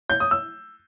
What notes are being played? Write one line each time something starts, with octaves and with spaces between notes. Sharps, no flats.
G6
D#6
E6